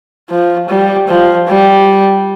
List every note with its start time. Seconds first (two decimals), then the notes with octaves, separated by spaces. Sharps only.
0.30 F3
0.69 G3
1.08 F3
1.48 G3